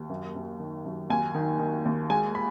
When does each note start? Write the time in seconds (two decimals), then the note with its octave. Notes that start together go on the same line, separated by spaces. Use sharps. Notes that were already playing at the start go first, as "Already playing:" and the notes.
Already playing: D#2
0.09 F#2
0.35 F#2
0.60 D#3
0.85 F#2
1.10 D#2 G#5
1.35 D#3
1.59 D#3
1.85 D#2
2.10 G#3 G#5
2.35 B5